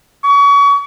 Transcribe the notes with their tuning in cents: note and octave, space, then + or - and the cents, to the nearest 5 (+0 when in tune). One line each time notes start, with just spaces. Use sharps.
C#6 +35